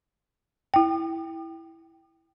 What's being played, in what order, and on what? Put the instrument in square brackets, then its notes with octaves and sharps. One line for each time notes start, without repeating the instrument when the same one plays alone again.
[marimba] E4 G5